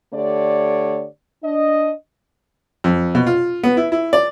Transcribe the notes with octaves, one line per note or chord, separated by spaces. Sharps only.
D3 A3 G4 C#5 D5
D4 D#5
F2
B2
F4
B3
E4
E4
D5